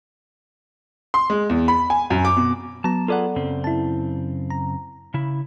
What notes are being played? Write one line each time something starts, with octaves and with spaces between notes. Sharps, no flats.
C6
G#3
E2
B5
G#5
F#2
D6
B2
F#3 B3 A5 A#5
F4 G#4 A4 B4 D5 F#5
F#2 C#3 C4
E4 A5
A#5
C#3 E4